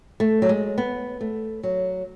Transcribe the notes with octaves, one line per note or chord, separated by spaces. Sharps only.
A3
F#3
G#3
B3
A3
F#3